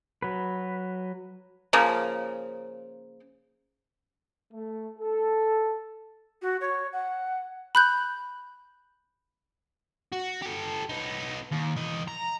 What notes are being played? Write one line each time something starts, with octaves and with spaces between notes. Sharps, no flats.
F#3 B4
C#3 F3 A#3
A3
A4
F#4
C#5
F#5
B5 F#6 G6
F#4
G4 A4
B3 D#4
D#2
E3 D#5
A#5